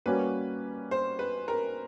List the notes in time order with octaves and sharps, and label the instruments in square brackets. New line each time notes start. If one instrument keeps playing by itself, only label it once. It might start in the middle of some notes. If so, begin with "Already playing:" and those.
[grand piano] G3 A#3 C#4 F#4 [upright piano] B4
[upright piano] C5
B4
A#4